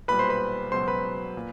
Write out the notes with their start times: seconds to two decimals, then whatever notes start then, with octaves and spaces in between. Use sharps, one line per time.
0.08 B1 A#2 G3 B4 B5
0.19 C5 C6
0.29 B4 B5
0.72 C#2 B2 F#3 C5 C6
0.88 B4 B5
1.37 A#2